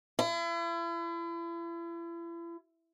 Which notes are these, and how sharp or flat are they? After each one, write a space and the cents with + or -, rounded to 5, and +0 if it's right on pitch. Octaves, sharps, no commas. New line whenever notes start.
E4 +40